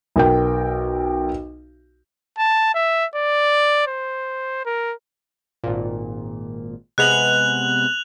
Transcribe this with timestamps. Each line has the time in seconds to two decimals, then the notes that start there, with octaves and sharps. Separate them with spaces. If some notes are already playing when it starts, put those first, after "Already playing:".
0.16 B1 A#4 G5
2.38 A5
2.74 E5
3.15 D5
3.87 C5
4.65 A#4
5.64 G#1 A#2
6.98 C3 G#3 B3 F#6 F7 F#7